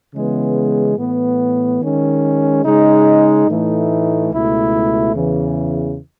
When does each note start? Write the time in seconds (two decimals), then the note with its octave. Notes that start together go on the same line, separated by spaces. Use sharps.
0.15 C#3 E3 G#3 B3
0.98 A2 E3 B3
1.81 D#3 G#3 C#4
2.65 C#3 G#3 D#4
3.48 A2 E3 A3 D#4
4.32 C#2 B2 A3 E4
5.15 E2 C#3 E3